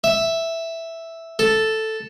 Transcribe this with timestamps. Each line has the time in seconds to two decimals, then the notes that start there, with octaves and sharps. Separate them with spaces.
0.04 E5
1.39 A4